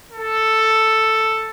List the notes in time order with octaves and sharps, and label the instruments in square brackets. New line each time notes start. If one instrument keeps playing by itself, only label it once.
[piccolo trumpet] A4